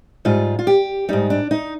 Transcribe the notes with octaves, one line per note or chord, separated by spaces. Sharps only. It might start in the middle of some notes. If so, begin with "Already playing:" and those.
G#2 G3 F4
F4
G4
G#2 G3 D#4
D4
D#4